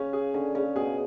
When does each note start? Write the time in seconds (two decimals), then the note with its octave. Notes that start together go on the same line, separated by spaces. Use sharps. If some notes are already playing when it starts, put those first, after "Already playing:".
Already playing: C#3 C#4
0.13 G#4
0.34 D3 C#4
0.55 C#3 C#4
0.76 B2 G#4